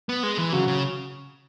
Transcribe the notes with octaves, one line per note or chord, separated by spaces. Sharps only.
B3
G#3
E3
C#3 F#3
C#3